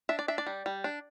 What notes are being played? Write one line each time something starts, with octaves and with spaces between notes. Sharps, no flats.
D4 E5
D5
D4 E5
D5
G3
G3
D4